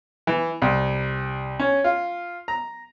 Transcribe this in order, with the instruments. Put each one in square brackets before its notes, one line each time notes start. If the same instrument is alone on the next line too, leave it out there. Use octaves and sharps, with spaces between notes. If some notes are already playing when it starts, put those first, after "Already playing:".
[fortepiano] E3
C2
C#4
F4
A#5